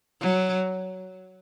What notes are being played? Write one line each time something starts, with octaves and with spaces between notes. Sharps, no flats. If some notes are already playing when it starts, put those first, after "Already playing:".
F#3